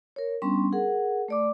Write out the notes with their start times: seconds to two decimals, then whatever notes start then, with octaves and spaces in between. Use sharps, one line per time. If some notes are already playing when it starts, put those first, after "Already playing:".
0.16 A#4 C#5
0.42 G3 B3 C#4 D4 C6
0.73 G#4 A#4 F#5
1.28 A3 D5 D6